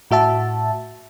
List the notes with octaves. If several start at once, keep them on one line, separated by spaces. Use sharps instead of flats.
A2 F#4 E5 A5